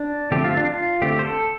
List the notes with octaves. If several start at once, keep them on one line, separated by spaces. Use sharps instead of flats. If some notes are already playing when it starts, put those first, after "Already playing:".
Already playing: D4
D3 F3 A3 C4 G4
F4
D4
F4
D3 A3 C4 G4
C5
A4